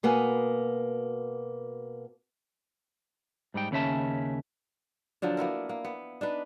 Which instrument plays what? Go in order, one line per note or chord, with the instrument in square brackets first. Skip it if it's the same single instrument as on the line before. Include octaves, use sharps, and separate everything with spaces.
[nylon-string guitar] B2 A#3 B3 F#4 G#5
[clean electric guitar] G#2 G3 D#4 G5
D#2 C#3 C#4 E5 A5
[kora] D3 F3 F#3 D4
A#3 B3 E4 A#4
A#3
B3
D4 D#4 B4